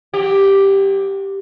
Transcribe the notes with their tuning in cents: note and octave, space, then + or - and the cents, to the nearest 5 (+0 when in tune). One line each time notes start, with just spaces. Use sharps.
F#3 -35 G4 +0